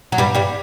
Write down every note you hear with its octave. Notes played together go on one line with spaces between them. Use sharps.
F#3
G2 G3
G2 G3